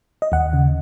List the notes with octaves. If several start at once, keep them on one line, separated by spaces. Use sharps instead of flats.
D#5
D#2 F#5
C#3